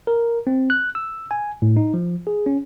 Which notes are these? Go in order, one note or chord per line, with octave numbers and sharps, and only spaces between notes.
A#4
C4
F#6
E6
G#5
A2
D#4
F3
G#4
C#4